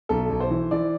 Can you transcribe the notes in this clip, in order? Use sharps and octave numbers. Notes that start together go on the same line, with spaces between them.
B1 A4
B1
C5
E3
E3 D5